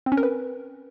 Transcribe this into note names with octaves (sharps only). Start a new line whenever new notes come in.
C4
C#4
A#4
B4